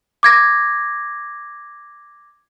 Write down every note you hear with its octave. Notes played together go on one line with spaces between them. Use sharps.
D6 G#6 A#6